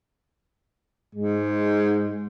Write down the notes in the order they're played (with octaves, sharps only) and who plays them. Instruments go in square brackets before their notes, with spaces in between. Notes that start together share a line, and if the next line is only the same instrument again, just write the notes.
[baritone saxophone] G#2 [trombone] G#3